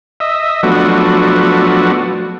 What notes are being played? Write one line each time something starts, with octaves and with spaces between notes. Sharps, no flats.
D#5 E5
F3 F#3 A3 B3 D4 F#4